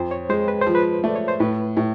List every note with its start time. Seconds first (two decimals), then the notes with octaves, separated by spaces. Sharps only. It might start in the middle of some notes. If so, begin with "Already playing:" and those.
Already playing: F2 C5
0.11 C#5
0.29 G#3 C5
0.48 B4
0.62 C5
0.67 F3
0.75 B4
1.04 A3 D5
1.16 C#5
1.28 C5
1.40 A2 B4
1.77 A2